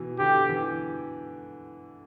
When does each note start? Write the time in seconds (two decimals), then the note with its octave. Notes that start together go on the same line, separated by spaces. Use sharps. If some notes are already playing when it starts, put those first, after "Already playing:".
Already playing: B2 E3
0.19 D3 G4
0.49 E3